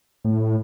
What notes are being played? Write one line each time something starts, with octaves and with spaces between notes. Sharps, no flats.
A2